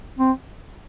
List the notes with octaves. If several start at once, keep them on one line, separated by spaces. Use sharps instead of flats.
C4